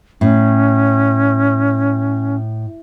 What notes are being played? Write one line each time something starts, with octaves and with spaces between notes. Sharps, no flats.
A2 C#4